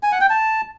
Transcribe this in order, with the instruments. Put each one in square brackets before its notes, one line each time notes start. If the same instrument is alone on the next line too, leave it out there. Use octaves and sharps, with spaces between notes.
[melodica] G#5
F#5
G5
A5